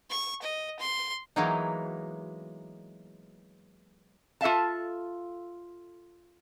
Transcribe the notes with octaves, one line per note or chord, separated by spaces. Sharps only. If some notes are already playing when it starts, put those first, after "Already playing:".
C#6
D#5
C6
E3 F#3 G#3 A#3 B3 D#4
F4 A4 E5 F5 A5